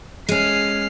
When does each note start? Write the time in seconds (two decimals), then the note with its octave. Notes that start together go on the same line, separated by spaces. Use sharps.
0.29 G#3 C#4 F6 C7